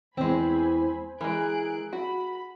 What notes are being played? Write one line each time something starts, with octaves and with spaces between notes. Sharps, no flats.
E2 E3 G#3 C4 C5 G#5 B5
E3 G#3 G#4 A#4 F#6 D7
F#4 B5